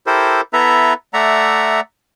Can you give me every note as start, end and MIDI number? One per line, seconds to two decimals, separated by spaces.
0.06 0.41 64
0.06 0.41 67
0.06 0.41 69
0.06 0.41 70
0.06 0.41 72
0.53 0.93 59
0.53 0.93 64
0.53 0.93 69
0.53 0.93 71
0.53 0.93 76
0.53 0.93 82
1.14 1.80 57
1.14 1.80 74
1.14 1.80 76
1.14 1.80 78
1.14 1.80 82